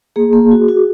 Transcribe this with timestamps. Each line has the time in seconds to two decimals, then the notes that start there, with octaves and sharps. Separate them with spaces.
0.16 A#3 G#4
0.33 A#3
0.51 F#4
0.69 F#4